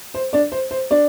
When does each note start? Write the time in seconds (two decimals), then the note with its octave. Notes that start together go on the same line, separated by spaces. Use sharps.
0.14 C5
0.33 D4 D5
0.52 C5
0.71 C5
0.91 D4 D5